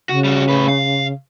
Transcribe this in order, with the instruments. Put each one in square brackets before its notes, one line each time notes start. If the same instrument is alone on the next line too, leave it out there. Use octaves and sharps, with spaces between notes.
[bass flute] C#3 [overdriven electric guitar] F#4
[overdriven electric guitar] G3 F#4
A2 B4
F5